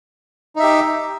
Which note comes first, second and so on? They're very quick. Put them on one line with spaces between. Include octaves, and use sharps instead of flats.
D#4 E5 G4